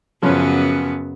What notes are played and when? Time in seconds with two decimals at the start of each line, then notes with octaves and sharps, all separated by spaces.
0.22 F#2 C#3 F3 B3 C#4 B4